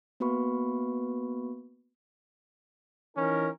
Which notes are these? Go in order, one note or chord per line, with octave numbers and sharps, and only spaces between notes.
A#3 B3 F#4 B4 B5 C#6
E3 C#4 D#4 A#4